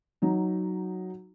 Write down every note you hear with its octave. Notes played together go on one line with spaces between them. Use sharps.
F#3 D#4